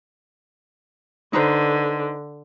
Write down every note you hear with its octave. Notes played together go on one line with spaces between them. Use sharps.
D3 D#4 B4 C5